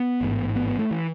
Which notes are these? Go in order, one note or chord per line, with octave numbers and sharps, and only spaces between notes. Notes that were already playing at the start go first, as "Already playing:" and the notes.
Already playing: B3
A1 G#2
B3
B3
A3
E3